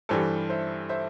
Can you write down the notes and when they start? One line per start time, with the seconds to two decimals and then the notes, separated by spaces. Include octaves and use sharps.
0.09 G2 E3 G3 A4 C5
0.49 C5 E5
0.89 C5 E5